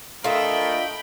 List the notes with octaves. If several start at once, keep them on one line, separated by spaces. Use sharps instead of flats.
A3 D4 F4 A#4 D#5 E5 G5 B5